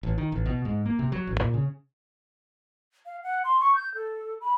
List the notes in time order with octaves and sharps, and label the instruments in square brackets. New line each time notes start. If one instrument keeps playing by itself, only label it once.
[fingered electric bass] A1
D#3
A1
B2
G#2
A#3
C3
F#3
A1
A#2
C#3
[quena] F5
F#5
C6
C#6
G6
A4
B5